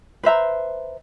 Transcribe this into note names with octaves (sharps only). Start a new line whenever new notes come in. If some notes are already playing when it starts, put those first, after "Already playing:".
B4 C5 E5 A#5